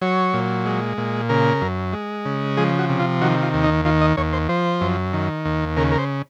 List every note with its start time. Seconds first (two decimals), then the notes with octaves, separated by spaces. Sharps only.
0.02 F#3 C#5
0.34 A#2
0.66 G#3
0.97 A#2
1.29 C#3 A#4
1.61 F#2
1.93 G#3
2.25 C#3
2.57 F3 G#4
2.79 F#4
2.89 C3
2.99 F4
3.21 D#3 F#4
3.43 F4
3.53 D#2
3.63 D#4
3.85 D#3 F4
4.01 D#5
4.17 D#2 C#5
4.33 C5
4.49 F3 C5
4.81 F#2
5.13 D#3
5.45 D#2
5.77 C#3 A#4
5.92 A#4
5.98 C5